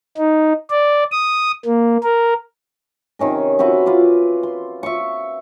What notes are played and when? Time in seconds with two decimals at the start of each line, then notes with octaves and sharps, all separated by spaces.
0.17 D#4
0.70 D5
1.12 D#6
1.65 A#3
2.03 A#4
3.19 C3 D#3 C#4 A#4
3.59 C4 F#4 B4 E5
3.86 F4 B4 D6
4.43 C6
4.83 E5 C#6